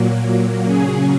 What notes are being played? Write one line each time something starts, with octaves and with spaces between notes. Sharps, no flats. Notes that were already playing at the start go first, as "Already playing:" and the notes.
Already playing: A#2 F#3 A#3
C#3 F#3 C#4 G#4